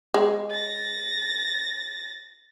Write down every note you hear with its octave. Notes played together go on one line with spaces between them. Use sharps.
G#3
A6 A#6